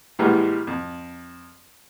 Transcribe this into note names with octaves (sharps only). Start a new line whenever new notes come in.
A2 E3 G3 G#3 A#3 B3
F2